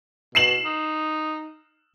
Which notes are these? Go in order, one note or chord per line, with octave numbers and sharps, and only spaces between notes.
B2 C7 E7 F#7
D#4